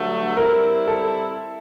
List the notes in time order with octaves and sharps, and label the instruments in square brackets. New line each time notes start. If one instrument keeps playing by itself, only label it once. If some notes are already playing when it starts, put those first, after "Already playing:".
Already playing: [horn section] G2 D3 F#3 A3
[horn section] G3 C4 E4 [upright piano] A#4
[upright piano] A4